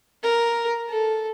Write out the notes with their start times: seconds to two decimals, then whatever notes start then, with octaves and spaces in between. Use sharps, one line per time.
0.23 A#4
0.89 A4